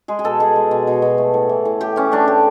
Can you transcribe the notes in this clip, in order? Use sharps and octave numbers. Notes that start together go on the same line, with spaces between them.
G#3 G#4
G#4
B2 A4
G#3 G#4
G#3
B2
B2
B2
A3
A2
E3
A2
A2 G4
E3 C#4
A3 D4
A2 G4